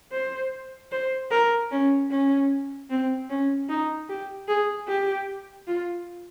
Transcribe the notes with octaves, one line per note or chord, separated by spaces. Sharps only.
C5
C5
A#4
C#4
C#4
C4
C#4
D#4
G4
G#4
G4
F4